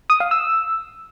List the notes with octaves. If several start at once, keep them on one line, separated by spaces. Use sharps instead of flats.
D#6
F5
E6